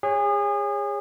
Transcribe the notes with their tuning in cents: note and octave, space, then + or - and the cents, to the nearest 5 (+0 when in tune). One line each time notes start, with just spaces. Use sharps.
G#4 -30 C#5 +0